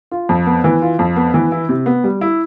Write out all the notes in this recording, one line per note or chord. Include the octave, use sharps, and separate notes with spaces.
F4
F2
B3
E3
F4
F2
B3
E3
E4
C3
B3
G3
E4